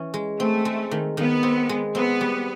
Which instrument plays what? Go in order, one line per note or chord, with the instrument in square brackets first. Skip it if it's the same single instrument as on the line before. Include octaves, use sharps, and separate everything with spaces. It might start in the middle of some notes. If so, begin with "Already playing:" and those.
Already playing: [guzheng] E3 C#4
G#3
[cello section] A3 [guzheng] C4
[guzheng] G#3
D#3
[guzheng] D#3 [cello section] B3
[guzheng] C4
G#3
[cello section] B3 [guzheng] C4
[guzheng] G3